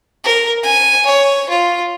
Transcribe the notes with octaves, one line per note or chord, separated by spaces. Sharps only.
A#4
G#5
C#5
F4